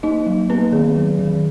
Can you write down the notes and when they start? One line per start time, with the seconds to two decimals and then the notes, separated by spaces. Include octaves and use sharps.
0.03 A#3 D#4 D#5
0.27 F#3
0.50 A#3 B3 B4
0.72 D#3 G#4
0.96 F#3
1.19 D#3